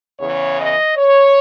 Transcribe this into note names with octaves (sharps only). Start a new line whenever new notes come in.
E2 C#3 E3 C#5
D#5
C#5